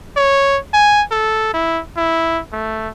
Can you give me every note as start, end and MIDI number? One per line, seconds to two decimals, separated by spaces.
0.17 0.58 73
0.74 1.03 80
1.11 1.51 69
1.54 1.81 64
1.97 2.40 64
2.52 2.89 57